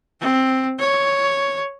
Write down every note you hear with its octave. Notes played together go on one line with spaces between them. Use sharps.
C4
C#5